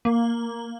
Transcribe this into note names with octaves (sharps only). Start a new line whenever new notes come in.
A#3